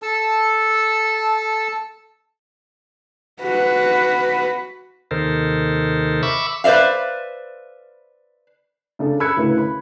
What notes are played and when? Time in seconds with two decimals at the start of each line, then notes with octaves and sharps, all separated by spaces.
0.02 A4 A5 E6
3.41 F#4 B4
5.11 D#2 C3 D#3 A4 A#4 C5
6.23 E5 B5 C#6 D6 E6
6.64 B4 C5 D5 E5 F5
8.99 C#3 D4 A4
9.20 B5 E6 F#6 G#6 C#7
9.36 D2 A2 C#3 E4 B4
9.58 B5